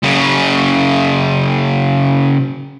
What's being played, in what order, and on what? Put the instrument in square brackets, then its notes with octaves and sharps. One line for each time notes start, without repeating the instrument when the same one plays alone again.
[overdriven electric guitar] F#2 C#3